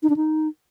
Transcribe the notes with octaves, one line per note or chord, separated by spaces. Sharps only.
D#4
D4
D#4